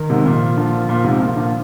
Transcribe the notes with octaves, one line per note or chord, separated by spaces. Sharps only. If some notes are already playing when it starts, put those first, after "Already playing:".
Already playing: D#3
G#2 C3
A#2 F3
A#2 D3
A#2
G#2 C3
A#2
A#2 D3